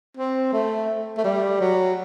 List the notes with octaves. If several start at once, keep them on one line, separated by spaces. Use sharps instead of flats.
C4
A3
A3
G3
F#3